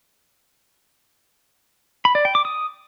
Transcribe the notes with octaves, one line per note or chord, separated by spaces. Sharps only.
B5
D5
G5
D6
D#6